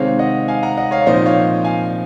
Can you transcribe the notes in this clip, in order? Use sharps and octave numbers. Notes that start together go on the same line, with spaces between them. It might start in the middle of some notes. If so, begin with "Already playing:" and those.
Already playing: C3 D#3 G#3 C4 C#5 F5
D#5 F#5
F5 G#5
F#5 A#5
D#5 F#5
C#5 F5
C#5
A#2 F3 C4 D#4 C5 D#5
C#5 F5
F5 G#5